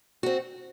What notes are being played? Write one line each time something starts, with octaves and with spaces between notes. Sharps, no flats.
C4 F#4